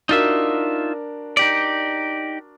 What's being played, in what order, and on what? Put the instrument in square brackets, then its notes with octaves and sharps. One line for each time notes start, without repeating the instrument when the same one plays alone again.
[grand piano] D4 F#4 A#4 [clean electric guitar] D#4 F4 E5
[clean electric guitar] D#4 G4 D5